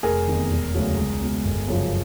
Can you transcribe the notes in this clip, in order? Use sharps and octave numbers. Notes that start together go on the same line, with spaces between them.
F1 G#4 A#4
E2 C3 D#3
E1
D2 C#3 F#3
C#2
B2 G#3
G1
F#2 C#3 F3